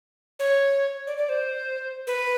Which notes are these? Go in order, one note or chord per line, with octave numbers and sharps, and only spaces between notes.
C#5
D5
D5
C5
B4